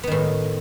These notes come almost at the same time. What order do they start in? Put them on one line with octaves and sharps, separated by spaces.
B3 D#3 A2